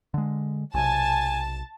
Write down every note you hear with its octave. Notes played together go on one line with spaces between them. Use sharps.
D3 G#3
B1 C3 G#5 A5